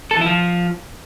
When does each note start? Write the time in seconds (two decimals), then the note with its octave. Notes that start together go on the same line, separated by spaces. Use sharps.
0.11 A4
0.16 E3
0.21 E4
0.26 F3